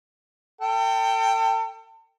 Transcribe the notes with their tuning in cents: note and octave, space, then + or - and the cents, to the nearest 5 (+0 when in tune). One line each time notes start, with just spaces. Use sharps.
A4 +35 G5 +0